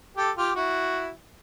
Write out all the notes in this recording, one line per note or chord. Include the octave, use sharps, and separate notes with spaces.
G4 A4
F4 G4
E4 F#4